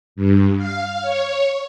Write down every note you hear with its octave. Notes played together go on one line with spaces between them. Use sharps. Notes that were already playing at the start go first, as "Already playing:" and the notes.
G2
F5
C#5